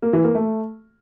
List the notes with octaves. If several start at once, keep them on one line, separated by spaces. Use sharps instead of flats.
A#3
E3
A#3
A3